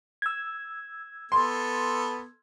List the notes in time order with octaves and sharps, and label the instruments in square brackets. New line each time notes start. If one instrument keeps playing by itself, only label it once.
[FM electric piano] E6 G#6
[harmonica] B3 A4 [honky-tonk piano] C6